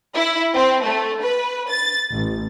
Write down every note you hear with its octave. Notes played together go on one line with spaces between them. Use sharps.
E4
C4
A3
B4
A6
A1